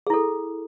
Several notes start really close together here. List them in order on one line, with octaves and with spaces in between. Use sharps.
G#4 E4 A4